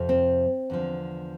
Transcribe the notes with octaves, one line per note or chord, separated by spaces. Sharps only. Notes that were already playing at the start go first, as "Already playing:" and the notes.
Already playing: F2 C3 F3
C4
E2 D3 F3